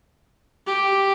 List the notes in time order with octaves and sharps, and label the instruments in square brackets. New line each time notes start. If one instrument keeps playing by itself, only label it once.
[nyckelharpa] G4